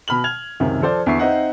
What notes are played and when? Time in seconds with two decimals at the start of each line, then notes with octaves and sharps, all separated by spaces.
0.08 B2 B5 F6 F#7
0.24 F6 G#6 F7
0.60 C#2 F#2 C3 D#3
0.82 F3 A4 C5 D5
1.06 E2 D3 E5 C#6 C7
1.19 C4 D#4 D#5 E5 F#5